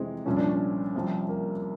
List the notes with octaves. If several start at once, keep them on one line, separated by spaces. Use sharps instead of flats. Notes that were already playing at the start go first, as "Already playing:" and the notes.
Already playing: F2 C3 E3 G#3 C4
C2 A#2 F3 C#4
D4
C#4
C2 C3 F3
A#3